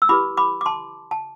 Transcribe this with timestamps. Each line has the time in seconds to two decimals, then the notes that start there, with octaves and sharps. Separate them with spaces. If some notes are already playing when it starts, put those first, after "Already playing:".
0.02 E6
0.09 E4 G4 B4 B5 D6
0.37 B5 D6
0.61 D6
0.66 A5 C6
1.11 A5